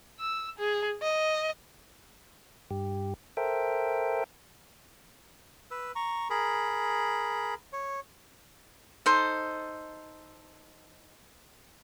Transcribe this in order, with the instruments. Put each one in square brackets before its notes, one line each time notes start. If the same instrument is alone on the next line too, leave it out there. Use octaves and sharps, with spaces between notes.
[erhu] E6
G#4
D#5
[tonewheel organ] G2 G4
A4 A#4 C5 E5 G5
[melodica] B4 E6
A#5 C#6
G#4 A#4 B5
C#5
[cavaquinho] D#4 A4 C5